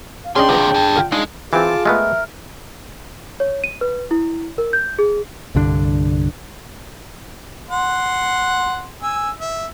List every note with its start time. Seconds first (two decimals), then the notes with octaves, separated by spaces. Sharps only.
0.24 F5
0.36 C#4 D4 G#4 D5 D#5 G5 C6
0.49 D#2 C3 F3 B3
0.75 G4 A4
0.96 D3 F4
1.12 G#3 D4 D#4 F5
1.53 E3 C4 F4 G#4 A5 D6
1.85 G#3 A3 B3 A#4 E5
3.40 C#5
3.64 D#7
3.81 B4
4.11 E4
4.58 A#4
4.73 G6
4.99 G#4
5.55 C2 G2 D3 D4
7.70 F#5 C6
9.03 G#5 E6
9.41 E5